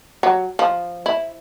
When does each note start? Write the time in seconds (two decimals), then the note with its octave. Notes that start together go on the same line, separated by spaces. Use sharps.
0.23 F#3
0.59 F3
1.06 E4